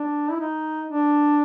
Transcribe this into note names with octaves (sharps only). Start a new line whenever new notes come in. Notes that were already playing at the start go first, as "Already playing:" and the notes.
Already playing: D4
E4
D#4
D4